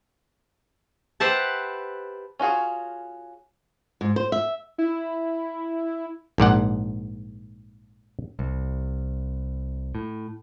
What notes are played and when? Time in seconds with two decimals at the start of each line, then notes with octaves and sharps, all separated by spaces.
1.20 G4 B4 C5 E5 F#5 A5
2.39 C#4 F4 F#4 G#4
4.01 G#2
4.16 C5
4.32 E5
4.78 E4
6.38 A#1 G#2 D5 F#5
8.39 C2
9.95 A2